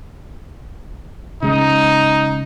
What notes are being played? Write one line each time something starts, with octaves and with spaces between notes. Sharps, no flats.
C#3 G#3 D#4